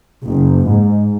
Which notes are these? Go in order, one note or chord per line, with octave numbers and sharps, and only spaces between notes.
F#1
G#2